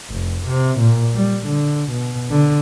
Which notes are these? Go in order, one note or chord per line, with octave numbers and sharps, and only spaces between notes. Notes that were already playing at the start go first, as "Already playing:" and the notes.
F1
C3
A#2
G3
D3
B2
D3